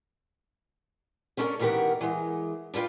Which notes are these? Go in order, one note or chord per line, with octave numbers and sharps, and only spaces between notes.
B3 C#4 D4 E4 A4 A#4
B2 D#3 E3 G4 A#4 F#5
E3 G#3
D4 E4 F4 B4 G5